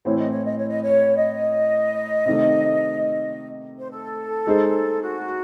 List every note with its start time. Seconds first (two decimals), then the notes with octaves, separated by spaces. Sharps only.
0.05 A2 E3 C4 C#5
0.18 D#5
0.31 C#5
0.45 D#5
0.57 C#5
0.69 D#5
0.82 C#5
1.16 D#5
2.26 C3 D#3 A3
3.80 C5
3.91 A4
4.47 G#3 D#4 G#4 C5
5.02 F#4